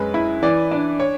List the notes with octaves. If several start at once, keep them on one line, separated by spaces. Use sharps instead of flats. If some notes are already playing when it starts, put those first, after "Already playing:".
Already playing: F#2 G#3 B4
E4
E3 D5
D4
C#5